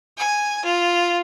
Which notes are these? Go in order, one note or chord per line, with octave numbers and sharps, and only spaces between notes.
G#5
F4